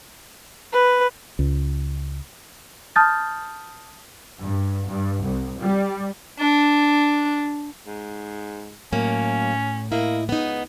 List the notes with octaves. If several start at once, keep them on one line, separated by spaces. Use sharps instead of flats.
B4
C#2
A5 D#6 F6 G6 A6
G2
G2
C2
G3
D4
G#2
A2 F#3 A#3 C#4
A#3 E4 D#5
C#2 B3 D#4